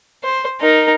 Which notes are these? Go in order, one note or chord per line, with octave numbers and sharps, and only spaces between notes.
C5
D#4 A#4